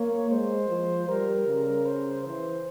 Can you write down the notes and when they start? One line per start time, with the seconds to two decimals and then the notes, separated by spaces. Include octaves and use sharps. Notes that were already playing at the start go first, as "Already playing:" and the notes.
Already playing: A#3 C#5
0.30 G#3 C5
0.69 F3
1.08 G3 A#4
1.47 C#3
1.86 C5
2.25 E3 C5